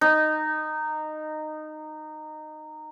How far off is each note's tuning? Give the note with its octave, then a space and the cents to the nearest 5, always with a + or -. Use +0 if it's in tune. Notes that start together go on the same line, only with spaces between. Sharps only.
D#4 -15